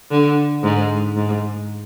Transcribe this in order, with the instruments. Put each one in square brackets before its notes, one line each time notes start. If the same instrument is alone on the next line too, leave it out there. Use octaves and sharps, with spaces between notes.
[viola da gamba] D3
G#2
G#2